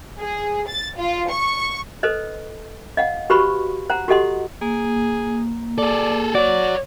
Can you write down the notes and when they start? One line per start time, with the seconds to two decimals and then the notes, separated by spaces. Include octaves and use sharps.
0.19 G#4
0.68 A6
0.98 F4
1.30 C#6
2.03 A4 B4 C5 D#5
2.97 D#5 F5 F#5
3.30 F#4 G4 B4 C5 B5 C#6
3.90 C5 F#5 A#5
4.08 F#4 G4 A4 D#5 F#5 C6
4.61 A#3 G#4
5.78 G#4 A4 D5
6.35 F#4 C#5 D5